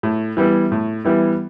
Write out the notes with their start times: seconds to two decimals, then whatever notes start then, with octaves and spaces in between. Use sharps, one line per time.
0.03 A2
0.37 E3 G3 B3 E4
0.72 A2
1.04 E3 G3 B3 E4